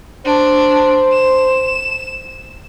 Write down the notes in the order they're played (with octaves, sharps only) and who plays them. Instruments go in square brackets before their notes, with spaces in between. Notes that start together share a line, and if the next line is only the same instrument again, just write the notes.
[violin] D4 [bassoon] C5
[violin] E7